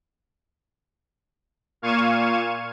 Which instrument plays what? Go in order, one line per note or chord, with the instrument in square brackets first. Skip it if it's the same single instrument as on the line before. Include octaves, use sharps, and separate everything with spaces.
[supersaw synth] A#2 F5 C#6 G#6 D#7 E7